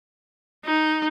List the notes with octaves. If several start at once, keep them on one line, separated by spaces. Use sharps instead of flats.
D#4